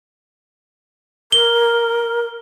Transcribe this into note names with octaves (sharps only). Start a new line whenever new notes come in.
A#4 G7